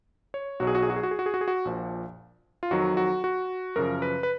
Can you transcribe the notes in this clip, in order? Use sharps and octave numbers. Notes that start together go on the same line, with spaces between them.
C#5
B1 B2 F#3 F#4
G#4
F#4
G#4
F#4
G#4
F#4
G#4
F#4
G#4
F#4
G#4
F#4
A#1 A#2 F3
F4
F2 D#3 F#3 F#4
F#4
F#4
F#2 C#3 F3 A#4
B4
B4